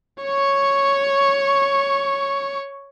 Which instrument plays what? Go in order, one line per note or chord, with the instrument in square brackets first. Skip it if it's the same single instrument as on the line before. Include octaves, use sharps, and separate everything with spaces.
[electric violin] C#5 C#6